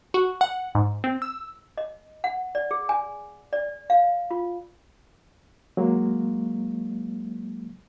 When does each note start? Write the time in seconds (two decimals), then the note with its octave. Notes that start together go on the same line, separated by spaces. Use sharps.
0.14 F#4
0.41 F#5
0.75 G#2
1.04 C4
1.22 E6
1.77 D#5
2.24 F#5
2.55 D5
2.71 G#4
2.89 G#5
3.53 D5
3.90 F5
4.31 F4
5.77 F#3 G#3 A#3